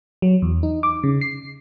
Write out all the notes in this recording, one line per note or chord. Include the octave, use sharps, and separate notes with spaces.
F#3
E2
D#4
D6
C#3
C7